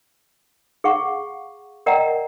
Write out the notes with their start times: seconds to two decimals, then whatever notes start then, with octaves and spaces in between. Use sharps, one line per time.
0.84 G#4 F5 F#5 C#6
1.86 A#4 D5 D#5 F#5 G5 A#5